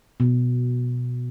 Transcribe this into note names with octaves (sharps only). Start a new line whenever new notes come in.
B2